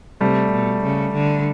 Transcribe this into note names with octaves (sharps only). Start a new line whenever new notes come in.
C3 G3 A3
B2
C#3
D3